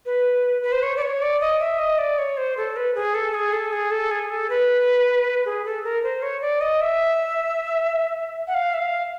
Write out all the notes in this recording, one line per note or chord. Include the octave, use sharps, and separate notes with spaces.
B4
B4
C5
C#5
D5
C#5
D5
D#5
E5
D#5
D5
C#5
C5
A4
B4
G#4
A4
G#4
A4
G#4
A4
G#4
A4
B4
G#4
A4
A#4
C5
C#5
D5
D#5
E5
F#5
F5
E5
F5